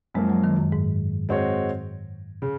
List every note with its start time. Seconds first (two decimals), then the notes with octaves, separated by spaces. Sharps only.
0.14 F#2 F3 G#3 A#3
0.30 F#3
0.44 D#3
0.57 F#2
0.72 G#2
1.29 G#3 C4 F#4 C#5
2.42 C#3